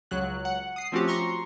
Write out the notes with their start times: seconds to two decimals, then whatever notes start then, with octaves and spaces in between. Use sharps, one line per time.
0.11 C#2 F#3 F#6
0.45 F#5
0.76 D#6 C7
0.92 F3 A3 C4 C#4 F#4 G4
1.08 A#5 C6 C#6